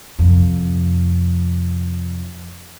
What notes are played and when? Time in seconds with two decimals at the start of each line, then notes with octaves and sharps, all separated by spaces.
0.19 F2 C3